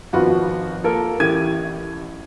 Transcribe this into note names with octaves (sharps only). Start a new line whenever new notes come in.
G#1 F3 B3 F4 F#4 B4
A#3 F4 A4 A#4
A1 A2 G4 G#6 D#7